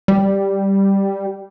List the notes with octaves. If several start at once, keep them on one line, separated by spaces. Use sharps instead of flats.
G3